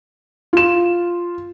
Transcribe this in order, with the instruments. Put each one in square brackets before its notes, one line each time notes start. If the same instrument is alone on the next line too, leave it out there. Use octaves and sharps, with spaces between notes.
[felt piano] F4 E7